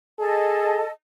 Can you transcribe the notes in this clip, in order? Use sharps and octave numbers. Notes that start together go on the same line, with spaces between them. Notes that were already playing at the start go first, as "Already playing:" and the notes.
G#4 A4 D#5 A5